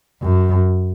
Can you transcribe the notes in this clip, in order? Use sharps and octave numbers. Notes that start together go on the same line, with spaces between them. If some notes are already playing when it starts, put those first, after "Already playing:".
F#2